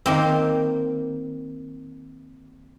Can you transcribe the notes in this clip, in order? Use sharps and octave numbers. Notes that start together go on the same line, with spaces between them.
D#3 A#3 C4